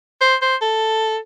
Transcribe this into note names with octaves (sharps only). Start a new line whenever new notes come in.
C5
C5
A4